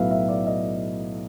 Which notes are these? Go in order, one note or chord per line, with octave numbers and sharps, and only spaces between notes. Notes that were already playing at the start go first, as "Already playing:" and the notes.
Already playing: B1 A2 F#3 B3 E5 F5
E5
D5
D#5